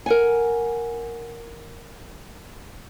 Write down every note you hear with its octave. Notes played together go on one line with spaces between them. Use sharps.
A#4 F#5 G#5